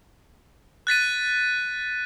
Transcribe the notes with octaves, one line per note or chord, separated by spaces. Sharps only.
F#6 A6 B6 D#7